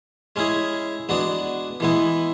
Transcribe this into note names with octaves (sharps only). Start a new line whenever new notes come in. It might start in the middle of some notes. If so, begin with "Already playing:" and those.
G#3 C#4 E4 G#4
G#3 B3 D4 F#4
E3 G#3 B3 E4